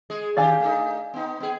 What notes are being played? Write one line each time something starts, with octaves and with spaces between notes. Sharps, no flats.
G#3 G#4
D#3 D4 G4 D5 F5 G#5
A3 D#4
B3 D#4
B3 G#4